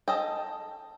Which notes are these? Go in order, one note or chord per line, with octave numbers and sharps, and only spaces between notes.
A4 D#5 G5